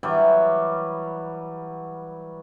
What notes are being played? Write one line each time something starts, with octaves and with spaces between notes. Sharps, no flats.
E3 F#3 G3